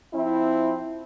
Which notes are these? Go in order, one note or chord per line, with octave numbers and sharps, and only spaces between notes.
F3 C4 E4